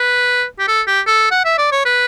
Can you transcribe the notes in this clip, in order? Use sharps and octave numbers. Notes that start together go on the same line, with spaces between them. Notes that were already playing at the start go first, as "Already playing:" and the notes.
Already playing: B4
G4
A4
G4
A4
F#5
E5
D5
C#5
B4